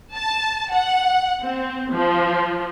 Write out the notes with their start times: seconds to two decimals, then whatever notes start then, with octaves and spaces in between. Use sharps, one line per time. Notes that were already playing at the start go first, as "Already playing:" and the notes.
0.13 A5
0.70 F#5
1.43 C4
1.92 F3